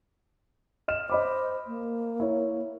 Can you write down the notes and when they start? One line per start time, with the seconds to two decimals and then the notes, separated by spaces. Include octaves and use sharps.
0.88 D#5 F6 E7
1.10 C5 D#5 B5 D6
1.67 A#3
2.20 E4 C#5